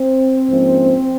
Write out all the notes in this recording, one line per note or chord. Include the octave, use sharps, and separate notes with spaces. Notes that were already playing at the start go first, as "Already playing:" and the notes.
Already playing: C4 C5
G#2 F3 A#3 C#4